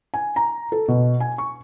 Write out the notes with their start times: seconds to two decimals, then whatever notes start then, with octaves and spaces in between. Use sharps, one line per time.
0.14 G#5
0.36 A#5
0.72 A4
0.88 B2
1.20 G#5
1.38 C#6